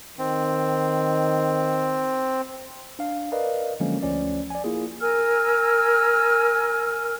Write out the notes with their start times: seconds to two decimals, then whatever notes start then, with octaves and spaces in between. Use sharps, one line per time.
0.18 D#3 C4
2.99 D4 F5
3.32 A#4 B4 D5 D#5 F5
3.80 D3 F3 F#3 G#3 A#3 C#4
4.03 D2 F3 C#4 D5
4.50 D5 G#5
4.64 A#3 E4 F4 G#4
5.01 A#4 G#5 E6 F6